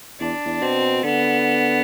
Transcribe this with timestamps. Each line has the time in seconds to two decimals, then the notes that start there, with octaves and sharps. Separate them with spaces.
0.20 E2 D4
0.45 E2
0.61 B2 C4
1.03 D3 B3